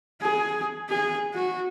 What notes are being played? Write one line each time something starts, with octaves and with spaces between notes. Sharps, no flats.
G#4
G#4
F#4